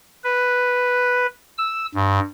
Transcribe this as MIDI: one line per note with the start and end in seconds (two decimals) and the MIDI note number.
0.24 1.27 71
1.58 1.86 88
1.95 2.20 43